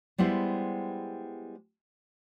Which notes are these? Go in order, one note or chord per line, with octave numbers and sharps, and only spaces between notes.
G3 G#3 B3 E4 C5